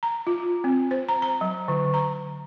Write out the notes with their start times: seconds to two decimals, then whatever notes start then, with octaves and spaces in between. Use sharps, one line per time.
0.03 A#5
0.27 F4
0.64 C4
0.91 C5
1.09 A#5
1.22 A#5
1.41 F#3
1.68 D3
1.94 A#5